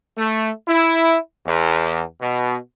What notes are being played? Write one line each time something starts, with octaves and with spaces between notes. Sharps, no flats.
A3
E4
E2
B2